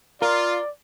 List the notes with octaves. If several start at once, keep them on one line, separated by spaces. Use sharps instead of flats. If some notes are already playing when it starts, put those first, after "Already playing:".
F4 A#4 D5